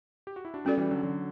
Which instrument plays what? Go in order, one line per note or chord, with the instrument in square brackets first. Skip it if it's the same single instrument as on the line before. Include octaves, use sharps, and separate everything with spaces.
[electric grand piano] G4
F#4
E4
D4 F#4
[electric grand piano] G3 B3 [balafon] C#4 F#4 A4 D5
[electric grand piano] E3 G3
D3 F#3
D3 F#3